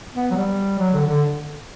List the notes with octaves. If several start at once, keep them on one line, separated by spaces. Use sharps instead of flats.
B3
F#3
G3
F#3
D3
D3